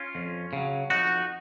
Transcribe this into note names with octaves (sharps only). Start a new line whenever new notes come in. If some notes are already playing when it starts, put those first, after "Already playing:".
Already playing: C#4 F4
F2
C#3 F#3
F2 D#4 F#4